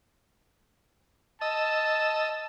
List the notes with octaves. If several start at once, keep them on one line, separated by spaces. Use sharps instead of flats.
D#5 A5 E6